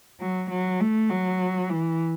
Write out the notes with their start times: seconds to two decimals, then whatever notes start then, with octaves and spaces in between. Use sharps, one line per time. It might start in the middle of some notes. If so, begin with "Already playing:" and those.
0.20 F#3
0.50 F#3
0.80 A3
1.10 F#3
1.69 E3